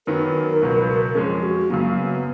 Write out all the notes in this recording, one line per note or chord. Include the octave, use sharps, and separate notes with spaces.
F#2 D#3 F#3 B3 A#4
C#2 B2 F#3 B3
F2 F3 G#3 C#4 G#4
F#4
F#2 C#3 F#3 A#3
B3